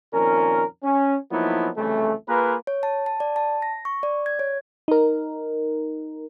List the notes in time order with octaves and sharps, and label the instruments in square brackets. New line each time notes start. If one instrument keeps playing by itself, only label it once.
[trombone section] F2 A#2 D#3 C#4 A#4
C#4
F3 F#3 A#3 B3 D#4 E4
C2 F2 C#3 E3 A3
A#3 F4 G#4 A#4 B4
[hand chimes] C#5
A5
A5
D5
A5
A#6
C#6
D5
G#6
C#5
[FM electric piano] D#4 A#4